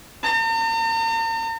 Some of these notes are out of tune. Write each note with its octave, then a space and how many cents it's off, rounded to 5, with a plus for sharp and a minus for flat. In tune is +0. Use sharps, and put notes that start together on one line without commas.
A#5 -45